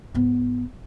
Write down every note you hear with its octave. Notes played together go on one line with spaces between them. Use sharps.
G#2 B3